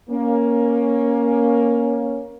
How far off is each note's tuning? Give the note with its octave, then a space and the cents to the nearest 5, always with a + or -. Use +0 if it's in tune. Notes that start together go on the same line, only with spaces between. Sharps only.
A#3 +15 C#4 +0